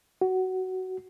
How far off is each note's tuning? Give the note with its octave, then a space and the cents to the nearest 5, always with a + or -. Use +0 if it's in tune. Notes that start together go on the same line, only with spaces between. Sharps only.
F#4 +15